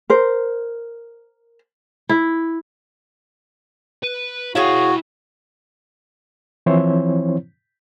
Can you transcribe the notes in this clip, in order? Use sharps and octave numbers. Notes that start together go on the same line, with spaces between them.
A#4 C5
E4
B4
E4 F#4 G#4 C#5 F5 G5
E3 F3 C4 E4 C5 C#5